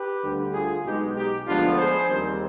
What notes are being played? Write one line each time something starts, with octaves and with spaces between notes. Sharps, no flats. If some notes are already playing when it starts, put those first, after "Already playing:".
Already playing: G4 B4
D2 D3 G3
F4 G#4
B1 B2 G#3 D#4 G4
D#4 G4
D2 D3 F3 G#3 B3 D4 F4
G#4 C5
D#2 D#3 G3 C4